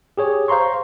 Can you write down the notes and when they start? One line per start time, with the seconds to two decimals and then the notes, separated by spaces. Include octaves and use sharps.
0.18 G4 G#4 C#5
0.48 C5 F5 A#5 C6 C#6